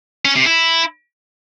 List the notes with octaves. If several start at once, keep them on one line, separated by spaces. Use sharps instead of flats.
C#4
C3
E4